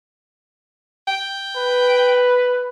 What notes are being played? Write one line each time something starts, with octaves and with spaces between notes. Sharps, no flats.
G5
B4